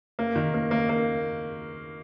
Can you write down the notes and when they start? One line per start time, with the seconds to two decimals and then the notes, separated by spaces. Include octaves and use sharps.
0.19 A#3
0.35 D#3
0.54 A#3
0.71 A#3
0.89 A#3